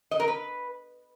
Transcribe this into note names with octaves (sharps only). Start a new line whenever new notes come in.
D#5
A#4
B4